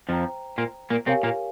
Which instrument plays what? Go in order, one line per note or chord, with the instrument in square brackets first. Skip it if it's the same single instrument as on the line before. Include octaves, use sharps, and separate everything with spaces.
[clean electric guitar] F2 F3 [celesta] C5 G5 A#5
[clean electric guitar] A#2 A#3
A#2 A#3
[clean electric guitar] C3 C4 [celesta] G4 A#4 C#5 F5 G#5
[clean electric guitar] A#2 A#3